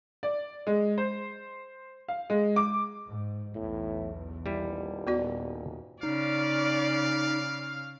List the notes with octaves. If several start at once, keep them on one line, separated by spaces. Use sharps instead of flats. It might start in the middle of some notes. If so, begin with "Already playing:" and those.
D5
G#3
C5
F5
G#3
D6
G#2
B1 E2 A2
D#1 G3 E4
D#2 A#2 B3 F#4 D5
C#3 D#4 D5 F5